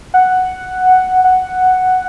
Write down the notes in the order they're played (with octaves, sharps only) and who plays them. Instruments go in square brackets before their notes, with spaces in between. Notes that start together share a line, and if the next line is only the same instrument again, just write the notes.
[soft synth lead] F#5
F#5